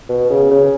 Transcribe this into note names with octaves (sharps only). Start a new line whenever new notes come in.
B2
C#3
C#3